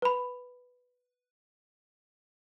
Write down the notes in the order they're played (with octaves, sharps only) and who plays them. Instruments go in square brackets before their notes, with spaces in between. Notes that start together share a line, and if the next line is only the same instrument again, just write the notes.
[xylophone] B4 B5